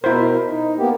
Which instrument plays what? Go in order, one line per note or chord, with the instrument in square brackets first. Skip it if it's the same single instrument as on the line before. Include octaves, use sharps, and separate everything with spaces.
[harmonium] B2 A#4 [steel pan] E4 C5
[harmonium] D#4
A#3 B3 G4